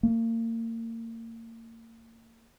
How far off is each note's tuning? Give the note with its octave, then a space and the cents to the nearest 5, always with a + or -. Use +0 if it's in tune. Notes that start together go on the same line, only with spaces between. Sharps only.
A#3 -35